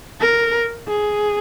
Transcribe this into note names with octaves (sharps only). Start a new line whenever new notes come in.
A#4
G#4